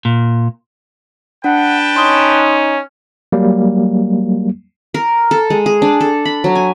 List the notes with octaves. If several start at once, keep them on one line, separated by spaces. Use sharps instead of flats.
A#2
D4 B4 F#5 G5 A5
C#4 D#4 C6 D#6
F#3 G3 A#3
A#4
A4
G#3
G#4
D4
A4
B5
F#3
G#5